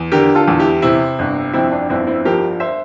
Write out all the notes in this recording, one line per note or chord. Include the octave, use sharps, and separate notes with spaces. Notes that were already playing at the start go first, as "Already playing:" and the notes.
Already playing: E2
D3 G4 A#4
F4 A4
E2
E4 G4
C3 C4 E4
G1
F2 C4 E4
D4
G1 C4 E4
C4 E4
F3 G4 A#4
C5 E5